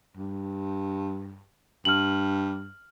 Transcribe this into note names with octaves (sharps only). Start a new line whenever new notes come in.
G2
G2 F6 F#7